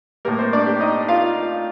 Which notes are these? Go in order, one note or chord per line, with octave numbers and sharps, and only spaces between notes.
A2 G3 A#3 A#4
C4 C5
D4 D5
G4
D#4 D#5
F4 F5